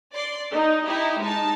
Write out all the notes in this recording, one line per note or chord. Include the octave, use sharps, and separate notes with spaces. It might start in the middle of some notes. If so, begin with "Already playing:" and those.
D5 C6
D#4
D#4 E4 G4
G#3 D#4 A5